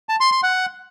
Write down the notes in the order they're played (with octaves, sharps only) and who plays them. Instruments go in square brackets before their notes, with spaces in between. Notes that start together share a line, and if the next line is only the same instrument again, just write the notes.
[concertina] A5
C6
C6
F#5